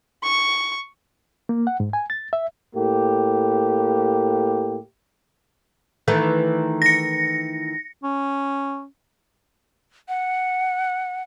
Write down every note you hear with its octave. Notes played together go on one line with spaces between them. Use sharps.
C#6
A#3
F#5
G#2
G#5
A6
E5
A2 A#3 G4
D#3 E3 A3
A#6 C#7
C#4
F#5